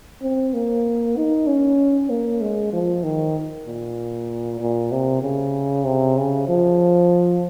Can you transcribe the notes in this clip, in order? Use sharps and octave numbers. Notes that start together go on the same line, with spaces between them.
C4
A#3
D#4
C#4
A#3
G#3
F3
D#3
A#2
A#2
C3
C#3
C3
C#3
F3